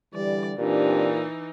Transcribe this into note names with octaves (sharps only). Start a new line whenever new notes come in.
D3 E3 G3 D5
A#2 E3 C4 D4 D#4 G4